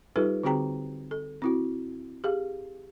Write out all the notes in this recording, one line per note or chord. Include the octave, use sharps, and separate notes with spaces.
G3 D#4 F4 G4 A4 B4
D3 C4 F#4 G#4 G5 A#5
A4
C4 E4 F#4
G4 G#4 F5